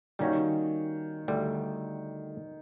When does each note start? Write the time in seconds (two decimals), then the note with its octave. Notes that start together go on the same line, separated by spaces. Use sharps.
0.19 D#3 G3 A#3 C#4 F#4
1.28 D2 D3 G3